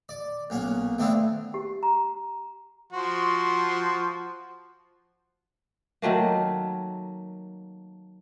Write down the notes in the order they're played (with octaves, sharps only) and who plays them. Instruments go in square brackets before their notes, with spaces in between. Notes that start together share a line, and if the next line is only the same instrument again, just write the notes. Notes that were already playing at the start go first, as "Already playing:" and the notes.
[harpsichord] D5
B1 A#3 C#4 F#5
A3 B3 C4 D4 E4 F4
[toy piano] G4
A#5
[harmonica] F3 F#4 C6
[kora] D#3 F#3 A3 A#3